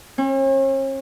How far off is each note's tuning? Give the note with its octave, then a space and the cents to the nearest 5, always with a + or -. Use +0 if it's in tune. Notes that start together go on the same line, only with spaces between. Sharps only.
C#4 -45